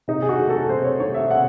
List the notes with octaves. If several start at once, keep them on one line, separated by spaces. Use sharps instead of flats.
C3 D#4
G#4
F#4
D#3 A3
A4
C3 C5
C#5
D#3 A3 C#5
E5
C3 F#5